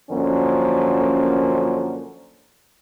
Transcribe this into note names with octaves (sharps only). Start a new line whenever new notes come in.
F#2 D3 F3 A#3 C#4